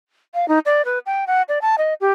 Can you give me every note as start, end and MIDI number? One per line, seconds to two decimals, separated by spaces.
0.34 0.48 77
0.48 0.59 63
0.66 0.85 74
0.85 0.99 71
1.06 1.25 79
1.27 1.42 78
1.48 1.59 74
1.62 1.76 81
1.78 1.94 75
2.01 2.12 67